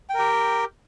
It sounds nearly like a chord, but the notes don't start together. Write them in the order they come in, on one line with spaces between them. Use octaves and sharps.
G5 A#4 G4